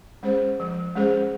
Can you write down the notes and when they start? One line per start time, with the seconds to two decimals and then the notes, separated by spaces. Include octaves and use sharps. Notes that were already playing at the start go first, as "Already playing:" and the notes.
0.23 G#3 C#4 G#4 C5
0.60 F3
0.95 G#3 C#4 G#4 C5